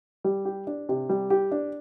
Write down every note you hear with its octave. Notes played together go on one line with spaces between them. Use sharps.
G3
G4
D4
C3
G3
G4
D4